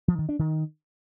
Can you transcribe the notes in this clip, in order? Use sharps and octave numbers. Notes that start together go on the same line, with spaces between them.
F3
D#3
D4
D#3